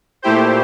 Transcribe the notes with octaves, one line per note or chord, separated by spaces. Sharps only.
A#2 A3 E4 G4 C5